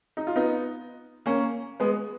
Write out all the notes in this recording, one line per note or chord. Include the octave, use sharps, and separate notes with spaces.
D#4
F4
B3 D#4
A#3 C#4
G#3 B3